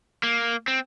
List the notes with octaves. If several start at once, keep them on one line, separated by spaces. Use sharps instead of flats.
A#3
C4